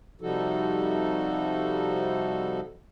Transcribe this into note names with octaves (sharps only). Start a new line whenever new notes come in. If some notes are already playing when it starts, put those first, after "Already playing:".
C3 F3 G3 D#4 F#4 A4